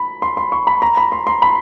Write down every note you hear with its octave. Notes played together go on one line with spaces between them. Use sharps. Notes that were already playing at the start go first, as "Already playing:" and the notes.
Already playing: B5
C6
C6
C#6
B5
A#5
B5
C6
C6
B5